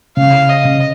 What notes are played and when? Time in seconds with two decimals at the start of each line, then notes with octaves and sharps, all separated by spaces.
0.17 C#3 F5
0.49 D#5
0.65 C#3